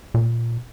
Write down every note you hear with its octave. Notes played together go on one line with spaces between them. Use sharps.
A#2